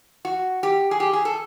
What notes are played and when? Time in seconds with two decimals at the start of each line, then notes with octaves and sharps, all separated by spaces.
0.25 F#4
0.63 G4
0.91 G#4
1.00 G4
1.13 G#4
1.25 A4